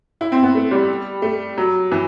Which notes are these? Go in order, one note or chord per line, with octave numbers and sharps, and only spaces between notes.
E4
C4
B3
A3
G3
A3
F#3
E3